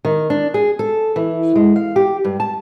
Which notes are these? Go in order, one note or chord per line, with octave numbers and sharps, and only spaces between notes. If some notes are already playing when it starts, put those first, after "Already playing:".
D#3
D4
G#4
A4
E3
G#3
F5
G4
G2
A5